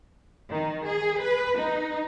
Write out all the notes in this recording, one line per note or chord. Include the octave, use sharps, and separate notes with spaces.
D#3
G#4
B4
D#4